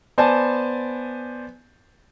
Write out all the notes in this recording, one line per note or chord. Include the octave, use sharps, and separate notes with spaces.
B3 C5 D5 G#5 A5